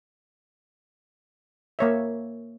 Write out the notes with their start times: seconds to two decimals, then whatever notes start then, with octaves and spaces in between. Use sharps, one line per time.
1.79 A#3 C#5 E5